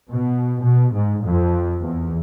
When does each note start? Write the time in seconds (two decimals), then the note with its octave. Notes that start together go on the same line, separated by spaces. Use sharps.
0.11 B2
0.62 B2
0.93 G#2
1.24 F2
1.81 E2